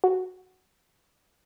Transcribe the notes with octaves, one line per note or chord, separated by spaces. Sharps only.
F#4